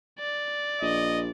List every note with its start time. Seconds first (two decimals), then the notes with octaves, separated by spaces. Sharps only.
0.19 D5
0.81 A#1 D#5